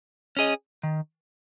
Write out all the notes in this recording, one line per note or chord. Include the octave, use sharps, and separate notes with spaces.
C#4 G#4 D#5
D#3